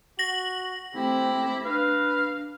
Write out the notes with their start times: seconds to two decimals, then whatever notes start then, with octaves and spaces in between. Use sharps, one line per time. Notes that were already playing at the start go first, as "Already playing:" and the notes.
0.19 F#4 A#6 F#7
0.95 A3 C4 E4 G4
1.65 D4 B4 F5